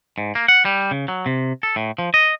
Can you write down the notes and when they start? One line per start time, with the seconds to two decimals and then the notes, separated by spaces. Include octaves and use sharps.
0.18 G#2
0.35 A#3
0.48 F#5
0.65 G3
0.91 C#3
1.08 F#3
1.26 C3
1.63 A4
1.76 A2
1.99 F3
2.14 D#5